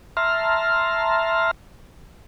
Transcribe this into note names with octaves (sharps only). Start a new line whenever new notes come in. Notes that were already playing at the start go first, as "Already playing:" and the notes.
E5 A5 A#5 C6 F6